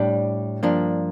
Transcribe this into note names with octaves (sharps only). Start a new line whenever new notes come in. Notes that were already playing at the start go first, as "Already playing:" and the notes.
Already playing: A2 G3 D4
G2 F3 A#3 D4